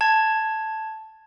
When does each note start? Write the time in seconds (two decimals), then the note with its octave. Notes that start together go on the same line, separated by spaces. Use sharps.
0.01 A5 G#6